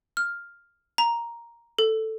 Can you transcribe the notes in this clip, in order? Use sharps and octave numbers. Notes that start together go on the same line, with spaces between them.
F6
A#5
A4